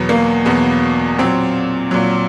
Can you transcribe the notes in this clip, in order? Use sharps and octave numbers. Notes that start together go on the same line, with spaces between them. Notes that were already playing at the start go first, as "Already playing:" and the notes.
Already playing: E2 B2 F#3 B3
A#3
E2 B2 F#3 B3
A#2 F#3 C4
A#2 F#3